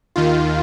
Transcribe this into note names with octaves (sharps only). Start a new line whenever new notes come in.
D#2 D#3 F4